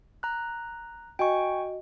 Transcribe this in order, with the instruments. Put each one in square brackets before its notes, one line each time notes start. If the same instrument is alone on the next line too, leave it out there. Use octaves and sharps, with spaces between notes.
[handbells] A#5 F#6
[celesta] F#4 D#5 [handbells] G5 G#5 C#6